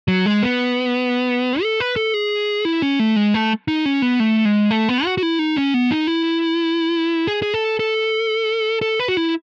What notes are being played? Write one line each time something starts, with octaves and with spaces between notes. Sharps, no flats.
F#3
G#3
B3
A4
B4
A4
G#4
E4
C#4
A3
G#3
A3
D#4
C#4
B3
A3
G#3
A3
B3
F#4
F#4
E4
D#4
C#4
B3
D#4
E4
G#4
G#4
A4
A4
A4
B4
F#4
E4